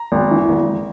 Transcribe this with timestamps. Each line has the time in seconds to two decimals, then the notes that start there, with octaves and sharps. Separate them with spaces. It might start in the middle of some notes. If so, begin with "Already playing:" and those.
Already playing: A#5
0.12 G#1
0.31 E3
0.49 G#1